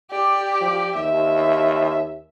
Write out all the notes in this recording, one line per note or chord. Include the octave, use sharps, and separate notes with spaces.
G4 D5
F3
D#2 E5